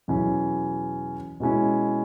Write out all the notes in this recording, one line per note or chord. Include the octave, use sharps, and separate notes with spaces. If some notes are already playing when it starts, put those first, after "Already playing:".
E2 B2 F#3 C#4 E4
B2 G#3 C#4 E4